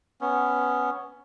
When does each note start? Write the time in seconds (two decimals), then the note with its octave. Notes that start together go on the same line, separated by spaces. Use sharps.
0.21 B3 C#4